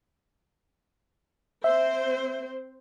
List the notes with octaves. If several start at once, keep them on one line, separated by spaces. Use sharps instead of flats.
C4 C5 E5